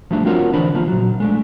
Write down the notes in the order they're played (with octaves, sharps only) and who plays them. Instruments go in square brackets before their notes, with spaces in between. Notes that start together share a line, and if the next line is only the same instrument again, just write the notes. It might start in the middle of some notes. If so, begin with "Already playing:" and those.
[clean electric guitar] F3 G3 A3 D4
C4 D4 F4 F#4 A#4 C#5
D3 E3 D4 C5 D5 B5
C#3 E3 F3 A#3 F4
A#2 F#3
G#3 A3 D4